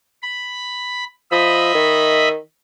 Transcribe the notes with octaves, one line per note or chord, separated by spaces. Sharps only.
B5
F3 D#5 E5 B5
D#3